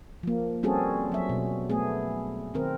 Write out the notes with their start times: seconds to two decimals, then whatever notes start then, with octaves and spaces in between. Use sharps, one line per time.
0.23 F3 A#3
0.63 G3 C4 C#4 F#4 G#4 A4
1.12 F#3 E5
1.29 B2
1.70 A3 B3 G#4
2.54 D#3 C4 A#4